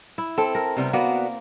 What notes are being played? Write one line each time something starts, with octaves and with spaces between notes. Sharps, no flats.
E4
C4 A4
A#4
C3 G3 B3
A#3 B3 F#4 D5